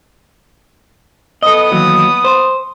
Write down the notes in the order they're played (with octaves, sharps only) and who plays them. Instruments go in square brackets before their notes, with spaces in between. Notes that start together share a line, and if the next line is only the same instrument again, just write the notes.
[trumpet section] B3 D#6 [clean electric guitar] A4 D#5
[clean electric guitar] D#2 E3 F#3
C5